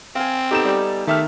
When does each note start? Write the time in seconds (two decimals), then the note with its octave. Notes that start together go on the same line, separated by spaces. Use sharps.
0.15 C4 F5 G#5
0.51 B3 D#4 G4 A4 E7
0.65 G3 D#5
1.07 D#3 A3 G4 E5 F6